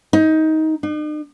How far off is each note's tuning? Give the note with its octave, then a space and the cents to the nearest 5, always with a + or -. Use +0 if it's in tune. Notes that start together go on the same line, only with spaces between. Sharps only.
D#4 +20
D#4 -45